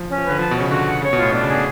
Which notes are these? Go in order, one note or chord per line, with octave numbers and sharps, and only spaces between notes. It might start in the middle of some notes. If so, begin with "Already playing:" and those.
Already playing: F3
C#4
F3
B4
D3
F3 A5
B2 C#5
C#3
D3 F#4
F#5
C#3 C#5
B2
A2 F4
B2 D4
C#3
G#4
B2